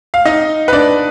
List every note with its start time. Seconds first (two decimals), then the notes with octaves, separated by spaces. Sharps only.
0.14 F5
0.25 D#4 D#5
0.68 B4
0.73 D4 D5